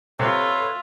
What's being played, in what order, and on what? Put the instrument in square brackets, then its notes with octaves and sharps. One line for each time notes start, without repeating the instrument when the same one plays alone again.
[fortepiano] C3 [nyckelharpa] F4 E5 [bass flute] A4 [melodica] B4 C#5